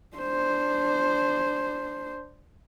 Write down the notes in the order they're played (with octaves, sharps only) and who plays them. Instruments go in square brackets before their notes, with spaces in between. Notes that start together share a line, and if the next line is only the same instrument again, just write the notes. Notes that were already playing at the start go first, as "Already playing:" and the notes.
[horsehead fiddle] D4 C5